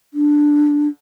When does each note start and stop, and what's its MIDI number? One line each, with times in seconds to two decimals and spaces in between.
0.14 0.88 62